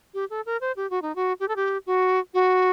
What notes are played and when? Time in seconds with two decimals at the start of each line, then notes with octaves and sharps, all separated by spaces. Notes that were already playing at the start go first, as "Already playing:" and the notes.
0.14 G4
0.30 A4
0.46 A#4
0.61 C5
0.76 G4
0.90 F#4
1.02 D#4
1.16 F#4
1.40 G4
1.48 A4
1.56 G4
1.86 F#4
2.34 F#4